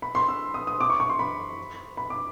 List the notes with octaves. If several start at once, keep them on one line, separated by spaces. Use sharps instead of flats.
B5
C6
E6
D#6
D#6
D6
C#6
C#6
C6
B5
B5
D6